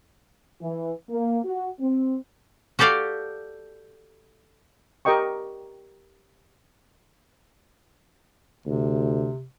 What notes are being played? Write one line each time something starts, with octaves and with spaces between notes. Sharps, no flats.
E3
A#3
F#4
C4
F#4 G4 A4 D5 F5
G4 A#4 D#5 G5 C#6
D2 C3